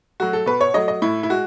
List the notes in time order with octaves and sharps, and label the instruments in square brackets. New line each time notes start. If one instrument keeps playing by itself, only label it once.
[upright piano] F#3 A3 F#4
A4
B2 B4
C#5
F#3 A3 D#5
D#5
A2 E4
E4
G#3 F#4